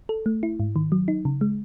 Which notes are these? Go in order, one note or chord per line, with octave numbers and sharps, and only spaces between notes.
A4
A3
E4
G#2
D#3
F#3
D#4
C#3
G#3